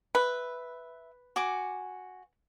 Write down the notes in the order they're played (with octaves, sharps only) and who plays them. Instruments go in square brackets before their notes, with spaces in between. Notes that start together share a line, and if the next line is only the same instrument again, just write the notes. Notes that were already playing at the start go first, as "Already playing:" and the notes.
[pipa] B4 [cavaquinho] E5
[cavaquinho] F#4 G#5 D6